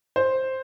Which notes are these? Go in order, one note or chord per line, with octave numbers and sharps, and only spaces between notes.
C5